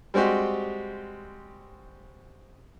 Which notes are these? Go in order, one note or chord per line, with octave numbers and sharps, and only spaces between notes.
G3 G#3 C4 F#4 G4